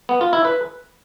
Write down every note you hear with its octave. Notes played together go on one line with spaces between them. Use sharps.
B3
F4
E4
B4